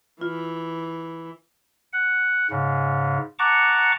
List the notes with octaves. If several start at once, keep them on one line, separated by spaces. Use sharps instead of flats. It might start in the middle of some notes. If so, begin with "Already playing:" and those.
E3 F4
F#5
G#2 C#3
F#5 A5 A#5 C#6 D6